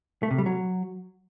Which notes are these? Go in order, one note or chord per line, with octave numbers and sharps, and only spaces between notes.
A3
C3
G3
F#3